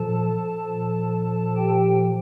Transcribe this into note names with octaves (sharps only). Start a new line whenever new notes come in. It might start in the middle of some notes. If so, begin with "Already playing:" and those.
Already playing: A#2 F3 A4 A5
A#2 F3
G4 G5